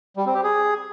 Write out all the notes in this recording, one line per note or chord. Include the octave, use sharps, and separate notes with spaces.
G3
C4
G4
G#4